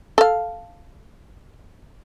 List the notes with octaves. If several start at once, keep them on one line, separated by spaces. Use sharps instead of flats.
A4 F5